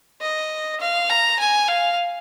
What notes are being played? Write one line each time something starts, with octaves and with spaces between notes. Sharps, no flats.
D#5
F5
A#5
G#5
F5